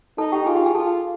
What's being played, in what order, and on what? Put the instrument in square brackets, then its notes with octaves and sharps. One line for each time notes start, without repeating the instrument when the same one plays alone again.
[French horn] D#4 [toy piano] A4 A5
[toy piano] G4 G5
[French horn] F4 [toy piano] G#4 G#5
[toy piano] G4 G5
G#4 G#5
[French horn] F4 [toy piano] A4 A5